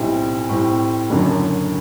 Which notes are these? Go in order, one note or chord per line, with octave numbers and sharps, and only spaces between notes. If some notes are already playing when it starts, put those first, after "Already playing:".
Already playing: B1 A2 G3 C4 E4
A2 G3 C4
F#1 F#2 D3 F#3